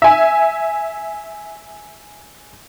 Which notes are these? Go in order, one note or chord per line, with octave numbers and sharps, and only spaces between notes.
E5 G#5